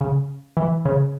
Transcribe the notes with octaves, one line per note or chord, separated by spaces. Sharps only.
C#3
E3
C#3